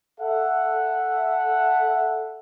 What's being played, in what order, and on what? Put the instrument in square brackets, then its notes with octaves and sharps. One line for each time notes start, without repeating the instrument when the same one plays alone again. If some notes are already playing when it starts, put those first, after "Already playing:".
[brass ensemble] A4 E5 F#5